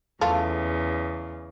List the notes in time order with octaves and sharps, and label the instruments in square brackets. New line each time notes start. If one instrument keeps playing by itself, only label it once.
[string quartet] E2 C#3 [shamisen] A3 F4